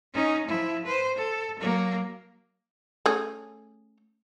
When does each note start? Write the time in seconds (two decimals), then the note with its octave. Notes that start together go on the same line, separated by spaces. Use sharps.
0.14 C#4 D#4
0.47 F3 E4
0.86 B4 C5
1.15 A4
1.59 F#3 A#3
3.06 A3 C#4 G#4